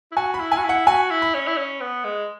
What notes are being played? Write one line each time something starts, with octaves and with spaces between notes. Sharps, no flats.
E4
F#4 G#5
B5
E4
G#5
F#4
E4
F#5
F#4 G#5
E4
B5
C#4
E4
C#4
B3
G#3